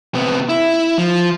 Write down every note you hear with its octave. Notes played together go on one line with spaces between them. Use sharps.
C3 B3
E4
F3